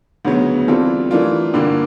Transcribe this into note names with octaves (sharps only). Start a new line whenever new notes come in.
D2 C#3 F#3 B3
E3 G3 C4 F4 A4
E3 A3 D4 F4 A#4
G2 D3 G3 A#3